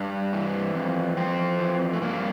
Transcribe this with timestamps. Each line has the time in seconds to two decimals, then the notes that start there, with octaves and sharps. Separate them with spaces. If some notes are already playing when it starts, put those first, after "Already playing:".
Already playing: G2 D4
0.33 E3
0.75 F2
1.17 F2 C4
1.59 E3
1.93 A3
2.02 G2 A#3